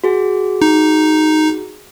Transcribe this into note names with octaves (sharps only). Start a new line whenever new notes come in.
F#4 G#4
D#4